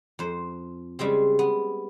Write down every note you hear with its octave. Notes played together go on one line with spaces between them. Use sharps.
F2 C5
C#3 G3 G#3 C4
B3